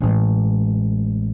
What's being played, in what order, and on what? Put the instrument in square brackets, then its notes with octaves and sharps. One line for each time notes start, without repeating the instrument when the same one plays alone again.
[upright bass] A1 G#3